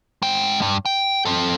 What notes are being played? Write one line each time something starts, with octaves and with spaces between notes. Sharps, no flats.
G#3 G5
G2
G5
C4 A4